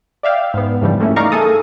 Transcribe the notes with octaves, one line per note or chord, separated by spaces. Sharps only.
D5 E5 F5 G5
G#2 B3
G#2 C#3 E3 F3 G3
F3 A3 A#3 C#4 E4
D#4 A#4 D5 F5 A#5 C#6
A3 A#3 G#4 A4 D#6